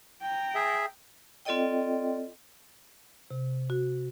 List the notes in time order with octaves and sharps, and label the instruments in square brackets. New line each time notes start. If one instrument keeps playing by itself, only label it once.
[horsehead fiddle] G5 A#5
[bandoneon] G#4 E5
[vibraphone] C4 F4 A4 D5 D#5 G5
[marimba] C3
F#4